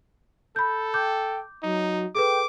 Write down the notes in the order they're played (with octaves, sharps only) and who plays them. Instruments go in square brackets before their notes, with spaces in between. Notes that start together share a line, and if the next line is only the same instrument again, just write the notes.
[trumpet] A4 [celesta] B5 G6
[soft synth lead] G5 [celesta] D6 G6
[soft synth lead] F#3 [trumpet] D#4
[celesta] G#4 A4 B4 [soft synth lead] G5 [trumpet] D6